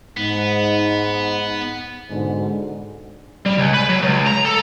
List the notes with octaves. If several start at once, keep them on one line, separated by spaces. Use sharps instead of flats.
G#2 B3 D#4
G#2 B2 D3
G3
C#2
B4
F#3
C#2
A#5
A4